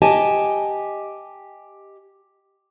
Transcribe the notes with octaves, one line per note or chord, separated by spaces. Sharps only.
G4 D#5 G#5 A5